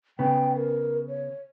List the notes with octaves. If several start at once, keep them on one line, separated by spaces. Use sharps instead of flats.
C#3 B3 G5
A#4
C#5